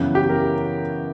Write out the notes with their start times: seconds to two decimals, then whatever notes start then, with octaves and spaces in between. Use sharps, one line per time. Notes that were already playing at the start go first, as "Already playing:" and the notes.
Already playing: F#2 C#3 E3 B3
0.15 G4
0.29 A#4